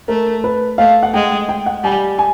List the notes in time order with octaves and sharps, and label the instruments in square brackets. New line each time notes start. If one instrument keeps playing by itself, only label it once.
[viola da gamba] A3 [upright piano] A#4
[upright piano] B4
[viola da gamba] A3 [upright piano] F5
[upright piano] F#5
[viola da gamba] G#3 [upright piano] G5
[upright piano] G5
F#5
[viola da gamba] G3 [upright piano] G#5
[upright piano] G#5